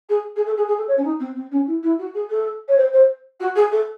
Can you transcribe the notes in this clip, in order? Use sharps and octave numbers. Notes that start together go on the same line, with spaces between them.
G#4
G#4
A4
G#4
G#4
A4
C#5
C#4
D#4
C4
C4
C#4
E4
E4
F#4
G#4
A4
C#5
C5
C5
F#4
G#4
A4